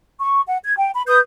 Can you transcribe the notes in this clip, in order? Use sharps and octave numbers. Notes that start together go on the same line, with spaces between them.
C#6
F#5
G#6
G5
B5
B4 D#6 G6